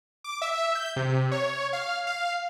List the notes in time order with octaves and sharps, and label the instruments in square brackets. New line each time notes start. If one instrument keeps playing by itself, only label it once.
[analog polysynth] D6
E5
G6
C3
C#5
F5
F5